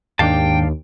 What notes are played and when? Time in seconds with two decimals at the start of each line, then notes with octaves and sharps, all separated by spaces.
0.19 D#2 G#2 D#3 D4 G4 F5 G5 A5